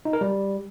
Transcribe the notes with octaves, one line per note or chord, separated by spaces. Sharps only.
D#4
A#4
G3